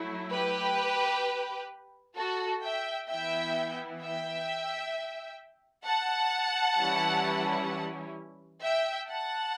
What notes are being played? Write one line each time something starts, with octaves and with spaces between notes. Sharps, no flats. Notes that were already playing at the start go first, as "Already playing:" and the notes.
Already playing: F#3 A3 E4
G4 B4
F#4 A4
E5 G5
E3 B3 E4 E5 G5
E5 G5
F#5 A5
E3 G3 C#4 E4
E5 G5
F#5 A5